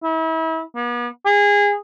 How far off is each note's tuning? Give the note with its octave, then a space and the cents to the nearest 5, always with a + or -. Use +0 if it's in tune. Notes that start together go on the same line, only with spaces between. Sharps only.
E4 -35
B3 -40
G#4 -25